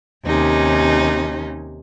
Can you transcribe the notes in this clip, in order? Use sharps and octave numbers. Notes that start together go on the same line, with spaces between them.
D#2 C3 C#4 D#4